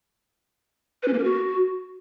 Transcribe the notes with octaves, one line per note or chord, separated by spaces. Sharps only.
B4
C#4
A#3
A#4
F#4